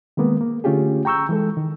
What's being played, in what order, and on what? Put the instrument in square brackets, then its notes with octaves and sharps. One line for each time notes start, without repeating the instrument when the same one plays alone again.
[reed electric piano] D#3 G#3 A#3 B3
A#3
D3 A3 C#4 F4 G4 G#4
G5 A#5 C#6 E6 G6
E3 G#3 A4
D#3